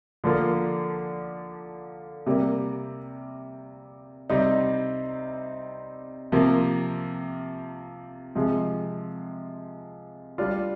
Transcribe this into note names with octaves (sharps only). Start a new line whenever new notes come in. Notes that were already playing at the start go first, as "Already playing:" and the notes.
D3 F3 A#3 F4
C3 G3 A#3
C3 G3 C4 D#4
C3 F3 A#3
C3 F3 G#3
G3 D4 F4